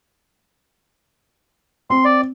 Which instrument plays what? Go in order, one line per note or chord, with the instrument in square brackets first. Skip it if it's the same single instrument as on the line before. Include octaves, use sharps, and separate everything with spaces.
[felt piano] C4 [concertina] C6
[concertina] D5